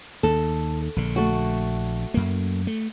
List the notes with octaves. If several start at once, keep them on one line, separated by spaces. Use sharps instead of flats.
D#2 A4
A#1 D3
A3 F#4
F#2 A#3
A3